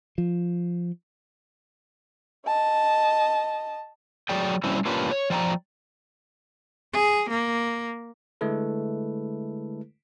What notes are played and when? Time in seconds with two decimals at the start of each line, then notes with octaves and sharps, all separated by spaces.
0.18 F3
2.46 D#5 A5
4.29 F#3 F#4 G#4 D5 G5
4.64 F#3 G3 A#3 C4 C#4 E4
4.85 A#3 C#4 D4 F4 G4 B4
5.11 C#5
5.30 F3 D5 G5 A5 A#5
6.93 G#4
7.30 A#3
8.41 D3 G#3 A3 E4 A4 B4